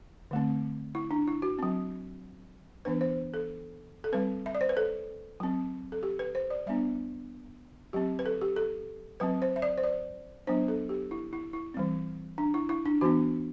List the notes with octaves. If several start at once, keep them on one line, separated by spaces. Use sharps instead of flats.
D3 A3 C4
E4
D4
E4
F#4
F#3 C4
E3 B3 D4 B4
C5
A4
A4
G3 C4 B4
E5
D5
C5
B4
A4
F#3 C4
A4
G4
B4
C5
D5
G3 B3 D4 E5
F#3 C4 G4
B4
A4
G4
A4
F#3 C4 B4
C5
E5
D5
C5
D5
F#3 B3 D4 C5
A4
G4
E4
E4
E4
E3 G3 C4
D4
E4
E4
D4
E3 B3 D4 F#4